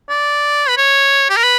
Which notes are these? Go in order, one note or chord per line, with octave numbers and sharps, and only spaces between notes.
D5
B4
C#5
G4
A#4
B4